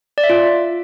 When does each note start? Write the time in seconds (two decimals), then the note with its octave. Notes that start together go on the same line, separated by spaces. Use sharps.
0.18 D5
0.24 E5
0.30 F4